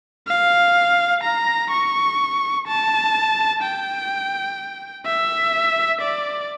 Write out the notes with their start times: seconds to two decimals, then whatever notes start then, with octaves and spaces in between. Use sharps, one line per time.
0.28 F5
1.23 A#5
1.71 C#6
2.68 A5
3.62 G5
5.06 E5
6.02 D5